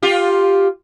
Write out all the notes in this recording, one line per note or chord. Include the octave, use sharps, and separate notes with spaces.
F4 G4